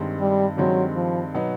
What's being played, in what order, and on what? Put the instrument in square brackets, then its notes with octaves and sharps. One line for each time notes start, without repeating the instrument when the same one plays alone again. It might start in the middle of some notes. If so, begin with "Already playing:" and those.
Already playing: [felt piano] G2 D#3 G#3 C4
[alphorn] G3
[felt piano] G2 D#3 G#3 C4 [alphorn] F#3
[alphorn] F3
[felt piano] B2 F#3 B3 D#4